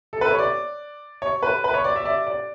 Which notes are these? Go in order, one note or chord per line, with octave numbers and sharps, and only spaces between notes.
A4
B4
C#5
D5
C#5
B4
B4
C#5
D5
E5
D5
D5